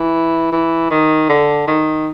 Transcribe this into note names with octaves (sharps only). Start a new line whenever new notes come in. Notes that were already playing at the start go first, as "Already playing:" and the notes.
Already playing: E3
E3
D#3
D3
D#3